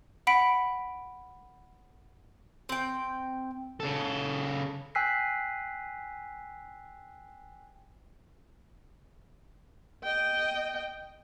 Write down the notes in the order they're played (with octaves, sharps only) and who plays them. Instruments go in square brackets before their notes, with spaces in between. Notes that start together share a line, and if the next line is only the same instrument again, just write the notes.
[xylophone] F#5 B5 B6 D7
[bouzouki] C4 G5
[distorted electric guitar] C#3 A4
[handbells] G5 G#5 E6 F#6 B6 C7
[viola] D#5 G5